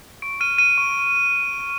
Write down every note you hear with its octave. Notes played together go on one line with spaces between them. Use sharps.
C#6 D7
F6 D#7
F6 D#7
C#6